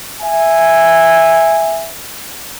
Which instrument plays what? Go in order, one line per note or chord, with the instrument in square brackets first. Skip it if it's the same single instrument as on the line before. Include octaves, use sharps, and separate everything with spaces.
[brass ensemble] E5 G#5